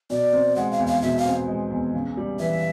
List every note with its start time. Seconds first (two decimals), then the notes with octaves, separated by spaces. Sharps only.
0.10 B2 D5
0.33 C4
0.56 G#3 F#5
0.71 F5
0.79 E2
0.87 F5
1.02 B2 E5
1.18 F5
1.25 C4
1.48 G#3
1.71 E2
1.94 C#3
2.17 G3
2.39 E3 E5